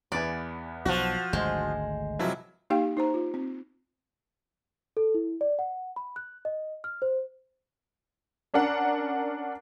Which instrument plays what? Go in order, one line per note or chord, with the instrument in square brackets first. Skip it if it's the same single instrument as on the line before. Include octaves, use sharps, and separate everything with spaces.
[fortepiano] E2 B3 G#5 [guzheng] D5
[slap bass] B1 [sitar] F3 F#4
[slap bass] G#1 D2 D3 [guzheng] G#3 [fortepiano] C5
[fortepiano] C3 F3 F#3 [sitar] E4
[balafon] A#3 D#4 G4 F5 G5
D#4 C5 A#5
F4
C4
[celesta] A4
E4
D5
F#5
B5
F#6
D#5
F6
C5
[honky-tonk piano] C#4 D4 A#4 F#5